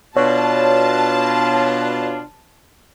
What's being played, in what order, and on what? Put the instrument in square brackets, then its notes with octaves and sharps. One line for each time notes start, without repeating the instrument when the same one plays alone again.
[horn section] B2 D4 F4 [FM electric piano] C#5 [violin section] A5